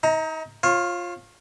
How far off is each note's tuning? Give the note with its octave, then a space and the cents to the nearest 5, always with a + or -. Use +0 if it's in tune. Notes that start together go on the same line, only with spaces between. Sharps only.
D#4 +35 A#5 +0
F4 +5 C#5 -35